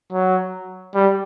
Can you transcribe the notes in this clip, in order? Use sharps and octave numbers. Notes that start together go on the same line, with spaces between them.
F#3
G3